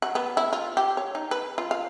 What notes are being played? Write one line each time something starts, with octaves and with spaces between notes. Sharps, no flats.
F#4
B3
E4
F4
G4
C#5
D#4
B4
F4
F5